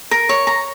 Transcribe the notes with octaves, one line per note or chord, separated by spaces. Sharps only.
A#4
C#5
A#5